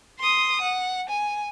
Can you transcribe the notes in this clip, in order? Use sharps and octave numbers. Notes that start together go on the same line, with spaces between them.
C6 D#6
F#5
G#5